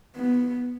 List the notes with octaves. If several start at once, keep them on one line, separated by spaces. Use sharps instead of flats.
B3